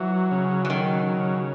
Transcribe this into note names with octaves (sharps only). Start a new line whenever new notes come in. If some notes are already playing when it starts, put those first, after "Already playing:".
Already playing: E3 F#3
C#3
E3
D#3 F#3
C#3